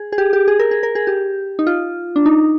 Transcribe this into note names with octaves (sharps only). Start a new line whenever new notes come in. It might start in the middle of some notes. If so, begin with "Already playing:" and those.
Already playing: G#4
G#4
G4
G4
G#4
A#4
G#4
A#4
G#4
G4
D#4
F4
D4
D#4